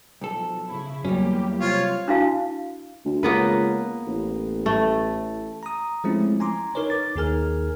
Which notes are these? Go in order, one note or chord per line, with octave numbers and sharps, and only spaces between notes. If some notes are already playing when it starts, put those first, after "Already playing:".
B1 F3 A4
C#3 E4
E2 F#3 G3 A#3 C#4 G4
C3 F4 C#5
D4 E4 F#4 F5 A5
D2
C#2 A#3 B3 B4
A1
A3
A#5 D#6
F3 G#3 A3 C4 C#4 E4
G#5 A#5 C6 D6
D#4 A#4 B4 C#5
D6 A6
D#2 D#4 G#4 A#4 G#5 F6